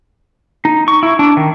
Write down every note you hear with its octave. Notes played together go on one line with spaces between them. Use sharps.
D#4
C#6
E4
D4
D#3